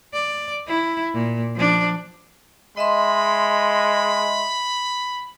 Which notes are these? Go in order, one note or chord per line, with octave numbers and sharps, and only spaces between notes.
D5
E4
A#2
F3 D4
G#3 D#5 E5 B5 C6